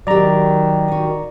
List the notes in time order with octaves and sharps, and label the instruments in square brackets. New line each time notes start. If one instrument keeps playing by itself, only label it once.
[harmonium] D#3 [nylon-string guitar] F#3 G4 [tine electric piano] D5 A#5
[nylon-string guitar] D#4 F#4